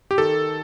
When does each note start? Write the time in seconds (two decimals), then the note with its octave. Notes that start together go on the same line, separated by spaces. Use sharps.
0.11 G4
0.18 D#3 A4